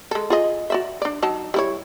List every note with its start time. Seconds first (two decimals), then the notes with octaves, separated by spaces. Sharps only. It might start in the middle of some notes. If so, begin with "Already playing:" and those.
0.11 G#3 A4
0.30 F4 G#4 D#5
0.70 F#4 D5 E5
1.02 D4 D5
1.22 F#3 D#4 A5
1.54 G3 E4 C#5